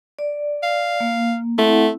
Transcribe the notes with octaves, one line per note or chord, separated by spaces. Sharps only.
D5
F5
A#3
A3 C4 E4 F#5